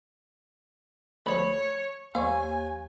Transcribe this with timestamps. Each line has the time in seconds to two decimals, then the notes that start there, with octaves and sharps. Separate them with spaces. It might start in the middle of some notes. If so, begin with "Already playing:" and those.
1.26 D2 F3 A3 C#5 D5 B5
2.15 D#2 A#3 C5 D5 G#5 C#6